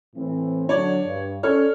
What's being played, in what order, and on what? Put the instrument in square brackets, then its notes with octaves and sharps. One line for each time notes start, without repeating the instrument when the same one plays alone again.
[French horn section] A2 E3 C4
[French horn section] D3 F#3 D4 [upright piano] C#5 D5
[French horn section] G2
[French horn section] C#4 D5 [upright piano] A4 C#5 F6